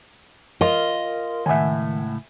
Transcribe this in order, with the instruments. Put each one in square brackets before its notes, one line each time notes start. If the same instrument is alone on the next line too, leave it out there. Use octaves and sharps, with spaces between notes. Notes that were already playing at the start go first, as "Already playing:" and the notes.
[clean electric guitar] F4 [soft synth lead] A#4 [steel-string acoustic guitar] D#5
[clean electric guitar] C#2 A2 [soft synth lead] D#3 [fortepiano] E5 F#5 G#5